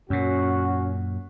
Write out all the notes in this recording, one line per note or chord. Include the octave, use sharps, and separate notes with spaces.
F#2 A#2 C#4 F#4